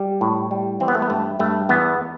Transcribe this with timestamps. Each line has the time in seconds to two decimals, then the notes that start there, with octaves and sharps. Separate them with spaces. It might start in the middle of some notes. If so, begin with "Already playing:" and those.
Already playing: G3
0.21 A2
0.51 G3
0.80 E3 C4
0.88 B3
0.95 A3
1.02 B3
1.10 G2 A3
1.39 G2 A3
1.69 E2 B3